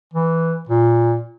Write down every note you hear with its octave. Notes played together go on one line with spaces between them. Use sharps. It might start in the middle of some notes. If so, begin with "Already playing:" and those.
E3
A#2